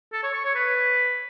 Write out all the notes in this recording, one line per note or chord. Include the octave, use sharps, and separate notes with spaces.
A4
C#5
C#6
C#5
B4